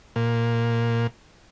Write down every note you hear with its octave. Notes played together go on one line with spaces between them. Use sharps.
A#2